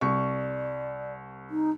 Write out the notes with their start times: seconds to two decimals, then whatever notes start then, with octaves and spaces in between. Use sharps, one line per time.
0.01 C2 D5 C#6
1.51 D#4